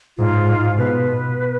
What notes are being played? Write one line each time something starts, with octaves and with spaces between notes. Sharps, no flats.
G#2 F4
G#2
B2 B4
B2